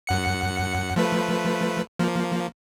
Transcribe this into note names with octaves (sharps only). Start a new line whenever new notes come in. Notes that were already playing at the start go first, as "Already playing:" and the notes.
F#2 F#5 C#7
F3 A3 B4
F3 A#3